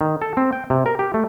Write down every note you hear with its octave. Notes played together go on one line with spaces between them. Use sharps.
D#3
A4
C4
G5
C3
A#4
G4
A3